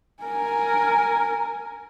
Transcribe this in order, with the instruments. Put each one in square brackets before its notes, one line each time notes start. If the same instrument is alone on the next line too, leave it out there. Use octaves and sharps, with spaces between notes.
[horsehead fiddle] A#4 G#5